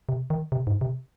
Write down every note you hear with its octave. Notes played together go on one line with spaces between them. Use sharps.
C3
D#3
C3
G#2
C3